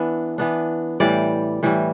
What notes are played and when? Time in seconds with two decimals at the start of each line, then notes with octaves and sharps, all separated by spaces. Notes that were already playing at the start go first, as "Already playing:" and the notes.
Already playing: E3 B3 D4 E5
0.38 E3 B3 D4
1.00 A2 E3 G3 D5
1.63 A2 E3 G3